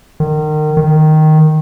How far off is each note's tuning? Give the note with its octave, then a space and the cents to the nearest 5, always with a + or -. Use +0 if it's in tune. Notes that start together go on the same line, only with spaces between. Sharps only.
D#3 -30
D#3 -5